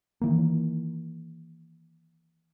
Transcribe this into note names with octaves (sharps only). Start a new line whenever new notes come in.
D#3 E3 A#3